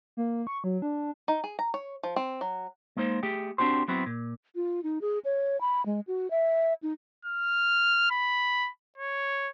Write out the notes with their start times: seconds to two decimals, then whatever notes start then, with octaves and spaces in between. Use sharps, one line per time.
0.17 A#3
0.47 C#6
0.64 F#3
0.82 D4
1.28 D#4
1.44 G#4
1.59 A#5
1.74 C#5
2.03 F3
2.16 C4
2.41 F#3
2.97 G#3 A#3 D#4 C5
3.23 A3 G4 G#4 G5
3.58 C4 D4 F#4 G4 C5
3.88 F#3 B3 C4 E4 F#4
4.06 A#2
4.55 F4
4.83 D#4
5.01 G#4
5.25 C#5
5.61 B5
5.86 G#3
6.07 F#4
6.30 E5
6.83 D#4
7.25 F6
8.11 B5
8.98 C#5